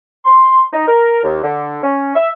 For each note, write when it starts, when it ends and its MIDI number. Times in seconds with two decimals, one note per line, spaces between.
0.25 0.62 84
0.73 0.85 63
0.87 1.22 70
1.24 1.40 39
1.43 1.78 50
1.83 2.15 61
2.15 2.30 76